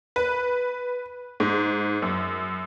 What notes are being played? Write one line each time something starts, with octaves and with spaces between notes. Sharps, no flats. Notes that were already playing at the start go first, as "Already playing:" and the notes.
B4
G#2
F#2